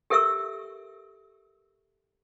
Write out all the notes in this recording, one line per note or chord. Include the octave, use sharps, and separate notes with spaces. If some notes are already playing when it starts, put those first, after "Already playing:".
G4 A4 A#4 E5 C#6 E6